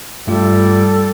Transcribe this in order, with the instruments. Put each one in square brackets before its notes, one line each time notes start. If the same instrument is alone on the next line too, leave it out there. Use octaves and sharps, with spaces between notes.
[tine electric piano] G2 A3 F4 [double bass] G3 [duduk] A4